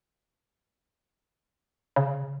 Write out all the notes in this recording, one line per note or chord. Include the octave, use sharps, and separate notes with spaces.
C#3